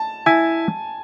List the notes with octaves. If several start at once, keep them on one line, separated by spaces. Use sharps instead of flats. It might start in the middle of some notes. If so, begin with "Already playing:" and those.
Already playing: A5
E4 G#5